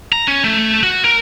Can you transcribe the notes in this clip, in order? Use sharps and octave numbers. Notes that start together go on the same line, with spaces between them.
A#5
C#4
A3
F#4
A#4